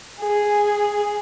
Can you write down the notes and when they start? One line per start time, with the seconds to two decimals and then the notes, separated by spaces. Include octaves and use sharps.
0.21 G#4